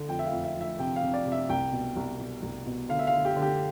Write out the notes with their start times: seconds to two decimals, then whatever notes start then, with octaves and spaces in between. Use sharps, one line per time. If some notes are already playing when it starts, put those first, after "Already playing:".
Already playing: D3 A3
0.08 F2 G5
0.19 E5
0.26 F5
0.32 F2
0.44 E5
0.55 F3
0.61 E5
0.79 C3 G5
0.96 F5
1.03 C3
1.14 D5
1.26 C3
1.32 E5
1.49 C2 G5
1.72 B2
1.96 C2
2.19 B2
2.42 C2
2.66 B2
2.89 D3 F5
2.99 E5
3.07 F5
3.12 D3
3.25 G4
3.36 D3
3.42 G4